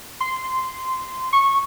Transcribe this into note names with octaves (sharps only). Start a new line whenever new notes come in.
C6
C#6